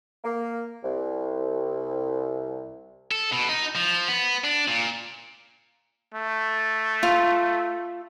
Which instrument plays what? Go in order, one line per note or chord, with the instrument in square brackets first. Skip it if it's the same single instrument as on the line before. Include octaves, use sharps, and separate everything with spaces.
[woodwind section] A#3
C2
[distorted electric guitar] A4
B2
D#4
F3
B3
D4
A#2
[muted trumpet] A3
[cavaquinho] F4